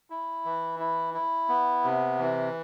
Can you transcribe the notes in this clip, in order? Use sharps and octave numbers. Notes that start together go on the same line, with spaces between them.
E4
E3
E4
E4
B3
C3
E3